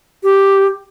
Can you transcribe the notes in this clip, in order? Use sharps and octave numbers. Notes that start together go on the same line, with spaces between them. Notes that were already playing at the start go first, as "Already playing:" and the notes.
G4